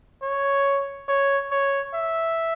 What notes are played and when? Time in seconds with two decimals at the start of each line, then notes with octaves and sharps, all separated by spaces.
0.22 C#5
1.08 C#5
1.51 C#5
1.94 E5